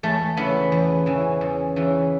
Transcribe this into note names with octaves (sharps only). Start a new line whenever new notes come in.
E2 A3
C#3 E3 B3
E2
C#3 E3
E2
C#3 E3